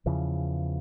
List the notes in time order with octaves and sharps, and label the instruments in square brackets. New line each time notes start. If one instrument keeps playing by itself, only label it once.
[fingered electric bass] E2 C#3 E3 F3